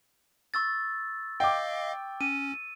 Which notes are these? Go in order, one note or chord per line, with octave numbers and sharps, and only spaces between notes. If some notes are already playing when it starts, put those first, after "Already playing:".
C#6 E6 A6
D#5 F5 G5 D6
C#4 D#7